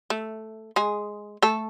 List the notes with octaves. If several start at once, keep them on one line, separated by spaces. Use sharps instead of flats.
A3
G#3 G#4
A3 A4